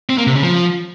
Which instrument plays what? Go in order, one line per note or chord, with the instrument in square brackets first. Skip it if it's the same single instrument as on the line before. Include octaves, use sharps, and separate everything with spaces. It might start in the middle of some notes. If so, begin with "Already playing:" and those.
[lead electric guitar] C4
A#3
C3
C#3
F3